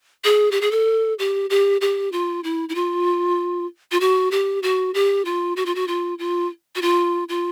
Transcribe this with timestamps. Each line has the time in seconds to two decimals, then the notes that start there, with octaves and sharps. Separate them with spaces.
0.24 G#4
0.51 G4
0.61 G#4
0.71 A4
1.19 G4
1.50 G4
1.81 G4
2.12 F4
2.44 E4
2.69 E4
2.75 F4
3.92 F4
4.00 F#4
4.31 G4
4.63 F#4
4.94 G4
5.25 F4
5.56 F#4
5.66 F4
5.75 F#4
5.88 F4
6.19 F4
6.75 F#4
6.82 F4
7.29 F4